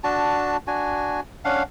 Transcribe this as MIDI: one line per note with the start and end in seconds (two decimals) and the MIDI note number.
0.04 0.57 62
0.04 0.57 66
0.04 0.57 81
0.67 1.20 62
0.67 1.20 66
0.67 1.20 80
1.45 1.63 61
1.45 1.63 62
1.45 1.63 77
1.45 1.63 78